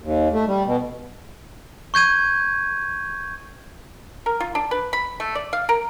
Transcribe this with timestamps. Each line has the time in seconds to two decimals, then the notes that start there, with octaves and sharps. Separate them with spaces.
0.02 D#2
0.33 A3
0.47 G3
0.66 B2
1.94 C#6 G6 G#6 D#7
4.26 A#4
4.40 F4
4.55 D4
4.71 B4
4.93 B5
5.20 A3
5.35 D5
5.53 F5
5.69 A#4